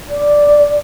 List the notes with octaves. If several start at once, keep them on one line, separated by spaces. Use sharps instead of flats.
D5